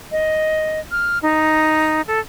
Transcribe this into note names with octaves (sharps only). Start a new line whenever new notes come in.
D#5
F6
D#4
A4